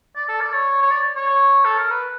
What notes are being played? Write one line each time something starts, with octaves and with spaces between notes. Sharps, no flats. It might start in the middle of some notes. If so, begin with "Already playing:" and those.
D5
A4
D5
C#5
C#5
D5
C#5
A4
A#4
B4